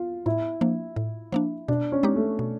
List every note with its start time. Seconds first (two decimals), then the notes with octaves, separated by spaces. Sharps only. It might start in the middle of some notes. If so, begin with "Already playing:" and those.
Already playing: F4
0.26 A2 E4
0.61 F3 A#3 D4
0.96 A2
1.32 F3 A#3 D4
1.68 B2 D4
1.92 C#4
2.03 G#3 C4 D#4 G4
2.16 A3
2.39 B2